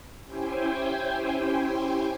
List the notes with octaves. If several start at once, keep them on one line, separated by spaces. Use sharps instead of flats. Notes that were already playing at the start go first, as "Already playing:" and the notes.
C#4 E4 G4 C5 G5 G#5